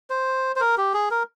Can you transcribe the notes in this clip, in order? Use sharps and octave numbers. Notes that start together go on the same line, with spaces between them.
C5
C5
A#4
G4
G#4
A#4